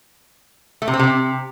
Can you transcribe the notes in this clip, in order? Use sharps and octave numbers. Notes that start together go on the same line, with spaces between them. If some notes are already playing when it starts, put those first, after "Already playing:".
A3
C3
C4
C3